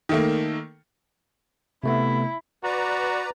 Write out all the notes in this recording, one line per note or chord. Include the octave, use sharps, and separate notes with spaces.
D#3 A3 A#3
C3 A3 B3 E4
F#4 B4 D5 A#5